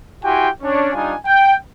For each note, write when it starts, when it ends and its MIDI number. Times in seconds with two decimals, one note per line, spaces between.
0.24 0.48 64
0.24 0.48 66
0.24 0.48 67
0.24 0.48 79
0.24 0.48 80
0.24 0.48 84
0.62 0.90 61
0.62 0.90 62
0.62 0.90 73
0.94 1.15 55
0.94 1.15 62
0.94 1.15 63
0.94 1.15 65
0.94 1.15 80
1.26 1.54 79